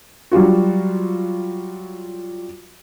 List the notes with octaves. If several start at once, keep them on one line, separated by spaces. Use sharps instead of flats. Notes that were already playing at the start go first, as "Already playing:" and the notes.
F#3 G3 F4 F#4